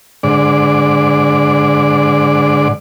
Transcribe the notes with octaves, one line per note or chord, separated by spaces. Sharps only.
G#2 D3 D5